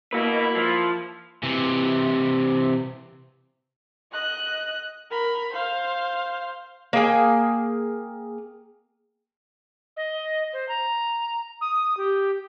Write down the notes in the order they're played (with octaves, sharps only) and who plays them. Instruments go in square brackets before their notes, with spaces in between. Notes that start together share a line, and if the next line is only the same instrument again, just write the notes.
[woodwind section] A#3 E4 [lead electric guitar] F#4 B4
[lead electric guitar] F3
[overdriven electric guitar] C3 E3
[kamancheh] D#5 F#6
A#4 B5
C5 F5
[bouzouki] A#3 G#4 G5 G#5
[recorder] D#5
C5
A#5
D#6
G4